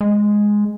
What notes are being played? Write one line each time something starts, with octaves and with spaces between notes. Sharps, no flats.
G#3